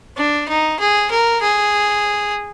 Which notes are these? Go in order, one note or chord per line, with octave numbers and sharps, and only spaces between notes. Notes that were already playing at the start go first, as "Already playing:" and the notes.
D4
D#4
G#4
A#4
G#4